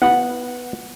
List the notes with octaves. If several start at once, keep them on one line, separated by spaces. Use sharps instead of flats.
B3 F#5